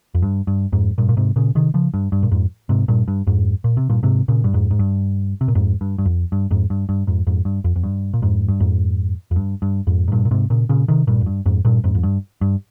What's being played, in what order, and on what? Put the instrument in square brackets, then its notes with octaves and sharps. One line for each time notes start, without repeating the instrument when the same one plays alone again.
[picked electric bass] F2
G2
G2
F2 G#2
G2 A#2
A#2
G#2 C3
A#2 C#3
C3 D#3
C#3 F3
G2
G2
A#2
F2 G#2
G#2 C3
G2 A#2
G2
F2 G#2
A#2
C3
G2 A#2
G#2 C3
A#2 C#3
G2
F2 G#2
G#2
G2
C3
A#2
F2 G#2
G2
G2
F2
G2
F2 G#2
G2
G2
F2 G#2
F2 G#2
G2
F2
F2
G2
A#2
F2 G#2
G2
F2 G#2
F2
G2
G2
F2 G#2
G#2
G2 A#2
A#2
G#2 C3
A#2 C#3
A#2 C#3
C3 D#3
G2 A#2
F2
G2
F2 G#2
G2 A#2
F2 G#2
F2
G2
G2